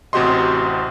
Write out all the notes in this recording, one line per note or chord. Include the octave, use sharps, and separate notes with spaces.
A1 C3 F#4 G4 D#5 C6